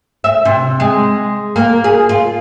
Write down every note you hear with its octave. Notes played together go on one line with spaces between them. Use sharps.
E5
C3
G#3
A#3
G#4
F4